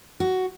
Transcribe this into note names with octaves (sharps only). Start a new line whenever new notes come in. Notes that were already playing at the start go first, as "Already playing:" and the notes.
F#4